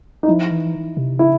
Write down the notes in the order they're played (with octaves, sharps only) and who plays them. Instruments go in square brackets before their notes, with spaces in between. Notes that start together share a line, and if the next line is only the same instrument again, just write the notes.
[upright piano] D#4
[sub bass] F3 [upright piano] E4
[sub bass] E3
C3
[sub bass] C#3 [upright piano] E4